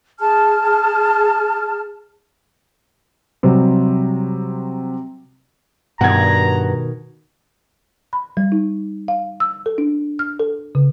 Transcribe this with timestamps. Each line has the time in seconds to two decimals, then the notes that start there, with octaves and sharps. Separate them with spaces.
0.19 G#4 A5 F6
3.43 C3 F#3 G3 C4
6.01 G2 B2 D#3 F#5 A#5 G#6
8.13 B5
8.37 G3
8.52 D#4
9.08 F5
9.40 E6
9.66 A4
9.78 D4
10.19 F6
10.40 A4
10.75 C#3